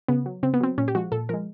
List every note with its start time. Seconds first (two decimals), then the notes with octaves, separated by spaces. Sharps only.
0.08 C#3 B3
0.26 F#3
0.43 C#3 C4
0.54 B3
0.60 F#3 C4
0.78 A#2 C#4
0.88 G4
0.95 F3 G#3 F#4
1.12 A#2 A4
1.29 F3 G#3 A#4